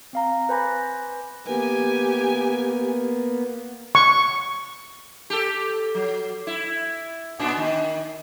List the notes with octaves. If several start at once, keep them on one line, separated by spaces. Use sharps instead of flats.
C4 F5 A#5
B4 C5 G#5 B5 D6 A#6
A#3 B3 G4 G#5
C#6
G4 A4
F#3
E4
A#2 B3 D4
D#3